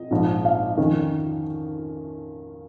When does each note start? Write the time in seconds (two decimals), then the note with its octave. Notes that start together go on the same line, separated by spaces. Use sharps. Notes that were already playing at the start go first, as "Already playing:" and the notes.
Already playing: D#5
0.11 A#1 G#2 F3
0.45 F5
0.77 F2 D#3 C#4